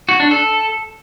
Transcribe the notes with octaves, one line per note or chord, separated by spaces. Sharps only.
F#4
D4
A4